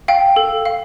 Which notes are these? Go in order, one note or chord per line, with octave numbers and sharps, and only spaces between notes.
F5 G5
A4
F5